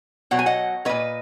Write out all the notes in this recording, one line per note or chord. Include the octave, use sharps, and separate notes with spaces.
B2 F#3 F#5
G#5
D#5 F#5
A#2 F#3 B4 D#5